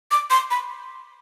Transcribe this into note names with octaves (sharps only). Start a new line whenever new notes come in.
D6
C6
B5